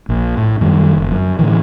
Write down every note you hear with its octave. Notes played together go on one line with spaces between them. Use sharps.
A#1
A2
F#2 D#3 G3
F#1
F#2
A2 D3 E3